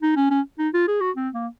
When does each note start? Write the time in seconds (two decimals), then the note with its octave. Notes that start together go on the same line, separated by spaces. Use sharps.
0.02 D#4
0.16 C#4
0.30 C#4
0.59 D#4
0.74 F4
0.88 G#4
1.01 F#4
1.16 C4
1.34 A#3